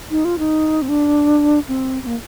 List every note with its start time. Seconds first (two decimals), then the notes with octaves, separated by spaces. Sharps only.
0.11 D#4
0.25 F4
0.39 D#4
0.82 C4
0.89 D4
1.68 C4
2.03 C4
2.07 A#3